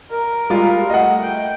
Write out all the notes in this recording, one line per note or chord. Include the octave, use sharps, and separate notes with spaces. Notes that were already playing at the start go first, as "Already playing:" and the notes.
A#4
G3 G#3 F4
A3 D#5 F#5
G5